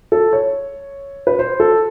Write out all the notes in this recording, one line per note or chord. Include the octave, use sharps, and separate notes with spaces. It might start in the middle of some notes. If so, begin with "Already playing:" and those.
A4
C#5
B4
C5
A4